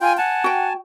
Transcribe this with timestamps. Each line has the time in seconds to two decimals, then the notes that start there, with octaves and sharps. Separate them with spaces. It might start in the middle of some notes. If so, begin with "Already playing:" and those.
0.01 F4 G5 G#5
0.18 F#5 G#5 A5
0.44 F#4 G5